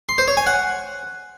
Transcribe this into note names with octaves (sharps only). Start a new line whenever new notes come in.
C6
C5
C#5
G#5
F#5